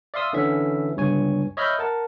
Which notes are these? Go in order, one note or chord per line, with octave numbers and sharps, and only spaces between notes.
D5 E5 F5 C6 D#6 E6
D3 E3 C#4 E5
G1 C#2 G2 C#5 G#5
C#5 D#5 E5 B5 F6 G6
A#4 F#5 A5